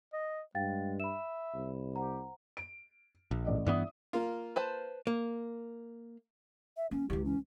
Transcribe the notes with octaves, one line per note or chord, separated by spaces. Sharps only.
D#5
G2 G#3 F5 G5 A6
E5 B5 E7
C2
G4 C5 F#5 A#5
D7
A#1
A1 D5 D#5
G2 E3 B3 D5 E5 D#6
A#3 F4
B4 C5 A5
A#3
E5
A#3 C#4
C#2 E3 G4
C#4